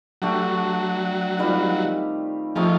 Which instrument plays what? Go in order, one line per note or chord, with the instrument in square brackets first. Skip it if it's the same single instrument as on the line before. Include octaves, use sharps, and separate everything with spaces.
[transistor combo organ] F#3 [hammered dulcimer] A3 D4 G4
[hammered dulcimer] D#3 G3 C4 F4
[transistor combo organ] F3 [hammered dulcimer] A3 C4 D#4 G#4